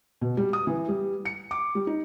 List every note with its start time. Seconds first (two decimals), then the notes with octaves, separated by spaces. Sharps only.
0.21 B2
0.37 G3
0.53 D#6
0.67 E3
0.88 G3
1.25 C#7
1.51 D6
1.75 G3
1.87 D#4